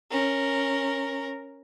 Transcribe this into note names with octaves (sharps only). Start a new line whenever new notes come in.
C#4 A#4